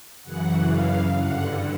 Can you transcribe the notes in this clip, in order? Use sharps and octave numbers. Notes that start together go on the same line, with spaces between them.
F#2 C#3 E3 F#5
F5
G2 D3 F#5